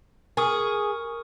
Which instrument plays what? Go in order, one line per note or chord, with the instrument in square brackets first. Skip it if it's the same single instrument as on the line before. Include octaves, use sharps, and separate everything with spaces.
[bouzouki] G#4 [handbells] A#4 C#6 D#6